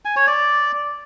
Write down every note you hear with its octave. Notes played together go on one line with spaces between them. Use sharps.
G#5
C#5
D5